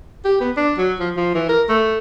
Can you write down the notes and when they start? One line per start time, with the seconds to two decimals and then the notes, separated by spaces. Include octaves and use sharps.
0.25 G4
0.41 B3
0.57 D4
0.78 F#3
0.99 F3
1.16 F3
1.34 E3
1.49 A#4
1.69 A3